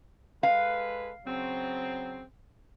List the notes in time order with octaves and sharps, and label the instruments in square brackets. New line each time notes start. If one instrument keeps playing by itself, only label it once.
[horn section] G#3 A4 B4 [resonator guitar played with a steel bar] F5
[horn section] C#3 F#3 C4